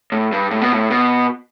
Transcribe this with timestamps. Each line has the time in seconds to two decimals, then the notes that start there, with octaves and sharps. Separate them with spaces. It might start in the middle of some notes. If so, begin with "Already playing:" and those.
0.12 A2
0.32 G2
0.51 A2
0.62 B2
0.72 A2
0.90 B2